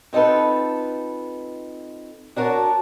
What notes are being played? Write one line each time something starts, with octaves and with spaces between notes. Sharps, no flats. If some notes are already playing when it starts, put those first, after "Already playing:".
C4 D#4 F4 A4 B4
D4 F#4 A#4 C5 C#5 A5